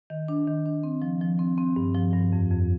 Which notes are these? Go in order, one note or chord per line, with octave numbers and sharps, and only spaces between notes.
D#3
D4
D#3
D4
C4
F3
F3
C4
C4
G2
F3
G2
F2
F2